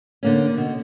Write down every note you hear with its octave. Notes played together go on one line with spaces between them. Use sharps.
D3 A#3 C#4
B2